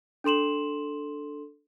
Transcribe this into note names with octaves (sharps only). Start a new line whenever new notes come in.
D4 A4 C6 E7 F#7